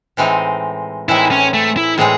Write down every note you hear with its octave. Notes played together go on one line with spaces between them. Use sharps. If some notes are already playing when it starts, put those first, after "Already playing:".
A2 E3 G#3 C4 D#4
A2 E3 G#3 C4 D#4 E4
C#4
A3
E4
A2 E3 G#3 C4 D#4 G#4